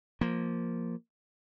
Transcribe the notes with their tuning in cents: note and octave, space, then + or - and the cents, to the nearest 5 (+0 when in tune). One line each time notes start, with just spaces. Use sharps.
F3 +0 A#3 +0